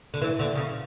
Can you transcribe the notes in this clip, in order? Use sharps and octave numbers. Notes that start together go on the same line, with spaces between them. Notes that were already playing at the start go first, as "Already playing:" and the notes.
D3
E3
D3
C#3